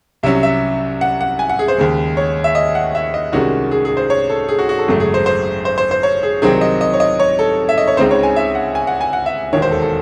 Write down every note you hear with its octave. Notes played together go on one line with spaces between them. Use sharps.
C2 C3 F#3 C#4 E5
E5
F#5
F#5
G#5
F#5
G#4
C5
D#2 C#3 G#3
C#5
E5
D#5
F#5
E5
D#5
C2 C3 D#3 G#3 C#4 F#4
G#4
G#4
C5
C#5
A4
G#4
F#4
F#4
A4
G#1 F#2 C#3 F#3 A3
G#4
C5
C5
C5
C5
C5
C#5
G#4
C2 C3 D#3 F#3 C4 G#4
D#5
D#5
C#5
D#5
C#5
A4
E5
D#5
C#5
C#2 C#3 G#3 C4 D#4 C5
C#5
G#5
E5
F#5
G#5
F#5
G#5
F#5
E5
E1 D#2 D#3 C#5
C5
A4
A4